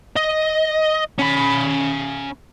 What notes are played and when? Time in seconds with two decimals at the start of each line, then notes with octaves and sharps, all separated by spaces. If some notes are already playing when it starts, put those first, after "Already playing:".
0.16 D#5
1.19 C#4 B5